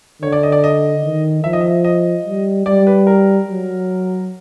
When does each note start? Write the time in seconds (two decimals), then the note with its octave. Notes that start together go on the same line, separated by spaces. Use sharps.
0.22 D3 C#5
0.32 D5
0.43 D#5
0.52 D5
0.64 D#5
1.04 D#3
1.44 F3 E5
1.53 D#5
1.61 E5
1.84 D#5
2.25 G3
2.66 G3 D5
2.87 B4
3.07 A#4
3.48 F#3